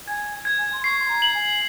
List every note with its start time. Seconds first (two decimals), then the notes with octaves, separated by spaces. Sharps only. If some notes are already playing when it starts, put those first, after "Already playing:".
0.08 G#5 G#6
0.45 G#6
0.59 G#5
0.72 C6
0.83 C#6 C7
0.99 C6
1.08 A#5
1.22 F#7
1.34 G#5